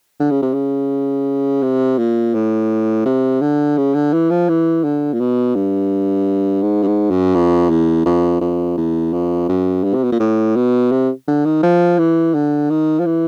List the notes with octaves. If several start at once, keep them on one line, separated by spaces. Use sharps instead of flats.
D3
C#3
C3
C#3
C3
A#2
A2
C3
D3
C#3
D3
E3
F3
E3
D3
A#2
B2
G2
G#2
G2
G#2
F#2
F2
E2
F2
F2
E2
F2
F#2
G2
C3
B2
A#2
A2
B2
C3
D3
D#3
F3
E3
D3
D#3
F3
E3